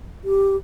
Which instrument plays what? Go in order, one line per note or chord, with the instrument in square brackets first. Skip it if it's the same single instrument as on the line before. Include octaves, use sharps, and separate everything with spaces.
[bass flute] G4